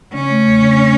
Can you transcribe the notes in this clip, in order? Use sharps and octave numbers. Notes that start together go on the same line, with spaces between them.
C#3 C#4
A3
E2
C#3
A3